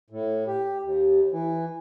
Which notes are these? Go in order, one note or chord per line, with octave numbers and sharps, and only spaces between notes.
A2
G4
D#2
E3